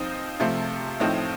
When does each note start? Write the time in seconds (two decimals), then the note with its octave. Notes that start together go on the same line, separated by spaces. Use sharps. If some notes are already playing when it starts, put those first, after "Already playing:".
Already playing: F3 C4 D#4
0.40 C3 F3 A3 C4
1.00 A2 F3 A3 C4 D#4